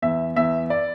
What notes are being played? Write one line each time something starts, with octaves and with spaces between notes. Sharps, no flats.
E2 E5
E2 E5
D5